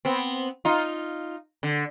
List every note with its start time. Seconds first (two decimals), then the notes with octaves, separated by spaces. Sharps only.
0.05 B3 C4
0.65 D#4 F4
1.63 D3